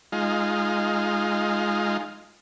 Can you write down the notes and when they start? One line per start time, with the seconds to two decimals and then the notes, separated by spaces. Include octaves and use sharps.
0.12 G#3 D#4 F4